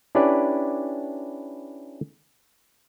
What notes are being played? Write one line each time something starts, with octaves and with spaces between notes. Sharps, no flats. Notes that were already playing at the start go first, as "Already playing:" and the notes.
C#4 D4 E4 G4 B4 D5